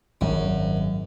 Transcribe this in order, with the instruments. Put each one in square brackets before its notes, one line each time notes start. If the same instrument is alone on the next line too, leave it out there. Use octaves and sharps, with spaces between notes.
[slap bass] G#1 [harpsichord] F#2